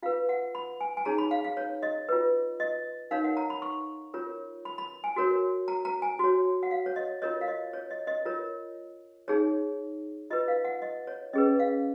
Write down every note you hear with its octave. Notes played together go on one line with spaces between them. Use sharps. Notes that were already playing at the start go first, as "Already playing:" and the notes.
F4 B4 F5
F#5
B5
G#5
G#5
D#4 G#4 C#5 A#5
B5
F5
F5
C#5
D#5
F4 B4
D#5
D#4 A#4 C#5 F5
F#5
A#5
B5
C#6
F4 A#4 C#5
B5
B5
G#5
F#4 A#4 C#5
A#5
A#5
G#5
F#4 C#5
F#5
F5
C#5
D#5
F4 A#4 C#5 D#5
F5
D#5
C#5
D#5
D#5
F4 A#4 C#5
D#4 G#4 C#5
F4 B4 D#5
F5
F#5
D#5
C#5
C#4 G#4 B4 D#5
F5